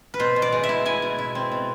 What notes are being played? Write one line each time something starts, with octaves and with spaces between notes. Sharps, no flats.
B4
B2 C5
B2
D5
G#3
E5
E4
E4 G#5
B2
E4
C4
B2